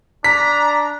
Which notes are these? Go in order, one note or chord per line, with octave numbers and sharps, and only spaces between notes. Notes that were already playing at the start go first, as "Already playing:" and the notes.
D4 A#5 B6